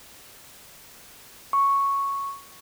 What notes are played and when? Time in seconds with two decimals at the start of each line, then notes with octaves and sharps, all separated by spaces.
1.53 C#6